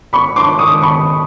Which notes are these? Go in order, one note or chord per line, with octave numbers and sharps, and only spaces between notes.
B5 C#6
C6 D6
C#6 D#6
B5 C#6